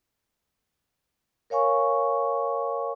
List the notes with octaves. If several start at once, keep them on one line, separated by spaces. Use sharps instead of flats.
A#4 C#5 F5 G#5 C#6